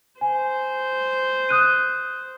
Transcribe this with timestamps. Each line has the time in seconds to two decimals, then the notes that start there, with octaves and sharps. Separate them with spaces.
0.21 C5 G#5
1.49 D#6 F#6 D#7